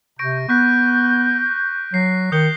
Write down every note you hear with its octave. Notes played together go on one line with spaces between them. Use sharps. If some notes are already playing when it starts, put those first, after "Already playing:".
C3 C#6 G6 A#6 D7
B3 C#6 F#6 G6 B6
F#3 A#6 C7
D#3 D#6 G6 C#7 G7